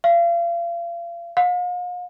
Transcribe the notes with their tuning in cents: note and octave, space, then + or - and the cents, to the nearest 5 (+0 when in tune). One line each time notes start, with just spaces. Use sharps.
F5 -35
F5 +40